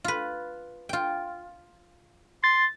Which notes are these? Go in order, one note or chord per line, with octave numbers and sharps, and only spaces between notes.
F4 B4
F4 G5
C6 A6